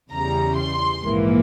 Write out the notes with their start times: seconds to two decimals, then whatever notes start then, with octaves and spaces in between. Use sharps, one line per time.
0.11 E2 C#3 E3 G3 A#5
0.57 C6
1.02 A#1 G#2 E3 A#3